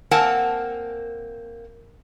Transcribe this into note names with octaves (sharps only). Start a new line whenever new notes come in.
A#3 C4 A#4 F#5 G#5 A5